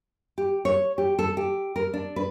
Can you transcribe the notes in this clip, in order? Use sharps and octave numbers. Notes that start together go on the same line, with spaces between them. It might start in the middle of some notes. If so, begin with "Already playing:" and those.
G4
C#5
G4
A4
G4
A#4
D4
B4